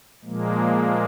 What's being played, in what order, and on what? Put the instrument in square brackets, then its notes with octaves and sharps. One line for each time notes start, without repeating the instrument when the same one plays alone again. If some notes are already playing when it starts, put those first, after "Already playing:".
[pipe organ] A#2 F3 G#3 A#3